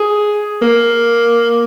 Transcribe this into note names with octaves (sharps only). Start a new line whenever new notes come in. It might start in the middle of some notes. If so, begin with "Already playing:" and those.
Already playing: G#4
A#3